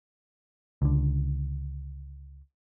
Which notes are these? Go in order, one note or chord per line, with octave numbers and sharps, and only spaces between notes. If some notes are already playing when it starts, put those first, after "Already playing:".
C#2 D3